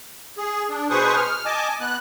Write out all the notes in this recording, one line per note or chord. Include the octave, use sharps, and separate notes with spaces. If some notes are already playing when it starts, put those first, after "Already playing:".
G#4
D4
B2 G#4 B4 C5 C#6 D#6
F6
D#5 G#5 A5 D6
B3 F#6